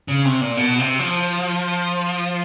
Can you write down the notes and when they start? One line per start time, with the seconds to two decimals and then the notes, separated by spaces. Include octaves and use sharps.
0.08 C#3
0.25 C3
0.41 A#2
0.57 B2
0.78 C3
0.99 F3